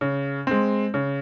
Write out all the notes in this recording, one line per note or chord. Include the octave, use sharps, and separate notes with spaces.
C#3
G#3 C4
C#3